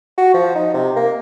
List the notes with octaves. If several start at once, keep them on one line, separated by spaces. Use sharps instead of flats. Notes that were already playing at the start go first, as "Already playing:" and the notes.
F#4
F3
D#4
C3
A#3